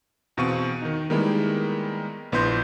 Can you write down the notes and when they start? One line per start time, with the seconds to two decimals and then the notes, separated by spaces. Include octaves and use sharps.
0.37 E2 B2 C4 F5 C#6 D#7
0.82 D#3 D#4
1.10 D#3 G3 G#3 A#3 B3 E4
2.32 A#1 B3 E4 C6 G6 A#6